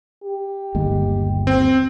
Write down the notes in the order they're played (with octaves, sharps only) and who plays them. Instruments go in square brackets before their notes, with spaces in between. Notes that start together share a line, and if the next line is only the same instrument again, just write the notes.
[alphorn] G4
[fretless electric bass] G1 D#2 G#3
[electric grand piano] C4